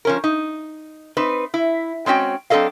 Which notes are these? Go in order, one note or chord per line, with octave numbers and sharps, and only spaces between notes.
F3 C#4 A#4
D#4
C4 D#4 B4
E4
G#3 C4 C#4 F#4 G5
F#3 C4 D4 A4 D#5 F5